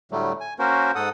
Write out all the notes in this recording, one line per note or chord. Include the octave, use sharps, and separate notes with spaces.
A2 D3 F#3 G3 A3
G#5
A#3 C#4 F#4 A#4 C5
G#2 A4 F#5 D#6